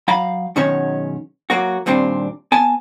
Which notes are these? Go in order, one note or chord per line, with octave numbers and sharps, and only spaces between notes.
F#3 F5 A#5 B5
F#2 B2 D#3 G#3 C#4 C#5
F#3 A#3 F#4
D#2 A#2 G3 C4 D4
B3 G#5 A5